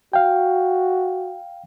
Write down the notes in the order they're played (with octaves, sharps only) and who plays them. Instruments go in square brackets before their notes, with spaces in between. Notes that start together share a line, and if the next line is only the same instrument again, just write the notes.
[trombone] F#4 [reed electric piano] F5 G5